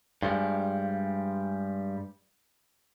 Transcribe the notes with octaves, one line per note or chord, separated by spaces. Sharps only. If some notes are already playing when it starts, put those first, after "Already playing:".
G2 F3 G3 G#3